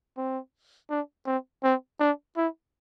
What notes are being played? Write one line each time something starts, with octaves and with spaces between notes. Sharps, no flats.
C4
D4
C4
C4
D4
E4